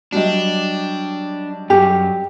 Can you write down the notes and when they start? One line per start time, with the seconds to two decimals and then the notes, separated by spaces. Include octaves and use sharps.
0.12 F#3 G3 D4 D#5
1.70 F#2 G4